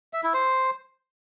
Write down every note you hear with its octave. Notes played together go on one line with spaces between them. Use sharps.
E5
E4
C5